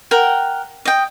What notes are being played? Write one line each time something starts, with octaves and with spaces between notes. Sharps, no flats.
A#4 F#5 G5
D#5 G5